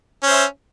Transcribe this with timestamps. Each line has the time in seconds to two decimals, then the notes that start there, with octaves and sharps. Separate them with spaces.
0.23 C#4
0.27 C5
0.31 E5